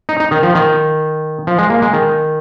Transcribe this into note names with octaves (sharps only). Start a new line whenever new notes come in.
D#4
D#4
D#3
F3
D#3
F3
G#3
A#3
G#3
D#3